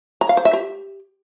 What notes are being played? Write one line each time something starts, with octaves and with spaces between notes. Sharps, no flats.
A#5
F5
C5
E5
G4